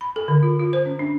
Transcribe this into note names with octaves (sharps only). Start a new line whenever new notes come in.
B5
A4
D3
F4
F4
C5
C#4
D4